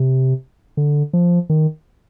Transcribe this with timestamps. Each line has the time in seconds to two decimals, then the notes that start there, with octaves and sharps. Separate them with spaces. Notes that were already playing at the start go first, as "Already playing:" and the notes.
Already playing: C3
0.77 D3
1.13 F3
1.50 D#3